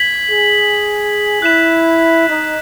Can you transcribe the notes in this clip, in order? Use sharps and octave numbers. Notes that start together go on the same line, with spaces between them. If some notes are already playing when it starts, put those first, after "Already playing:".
Already playing: G#6 B6 F#7
G#4
E4 F#6 B6 E7
D#4